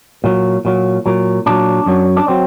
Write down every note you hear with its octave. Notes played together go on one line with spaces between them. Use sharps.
A#2 F#3
A#2 F#3
A#2 F#3
A#2 F#3 D4
F#2 F#3
D4
F#3 C4